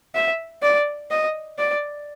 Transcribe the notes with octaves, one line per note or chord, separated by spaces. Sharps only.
E5
D5
D#5
D5